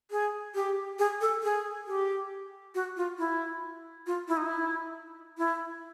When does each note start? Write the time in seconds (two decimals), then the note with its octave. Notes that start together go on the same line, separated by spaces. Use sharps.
0.11 G#4
0.55 G4
0.99 G#4
1.21 A4
1.43 G#4
1.87 G4
2.75 F#4
2.97 F4
3.18 E4
4.07 F4
4.28 E4
4.37 D#4
4.46 E4
5.38 E4